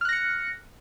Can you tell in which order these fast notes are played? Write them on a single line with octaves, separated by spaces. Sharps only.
F6 F#6 A#6 C#7